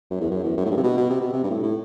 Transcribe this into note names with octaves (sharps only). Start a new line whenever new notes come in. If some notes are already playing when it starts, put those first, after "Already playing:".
F#2
E2
F#2
E2
F#2
A2
G2
C3
B2
B2
C3
B2
C3
G2
A2
A2